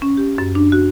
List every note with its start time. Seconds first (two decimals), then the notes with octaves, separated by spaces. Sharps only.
0.02 C#4
0.17 G4
0.38 F#2
0.55 D4
0.72 F#4